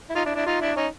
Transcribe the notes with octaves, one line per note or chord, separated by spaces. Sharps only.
E4
D#4 F4
D4 E4
D4 E4
D#4 F4
D4 E4
C#4 D#4